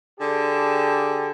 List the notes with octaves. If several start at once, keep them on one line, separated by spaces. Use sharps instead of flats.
D3 G4 G#4 G5 A5